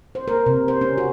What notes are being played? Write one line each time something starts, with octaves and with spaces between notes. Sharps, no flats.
C5
A#4
C3
C5
C#4
F#4